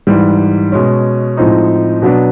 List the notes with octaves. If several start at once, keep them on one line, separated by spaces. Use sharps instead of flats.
G#2 E3 G3
B2 G#3 C#4
A2 F3 G#3 C4 D#4
B2 F#3 B3 D4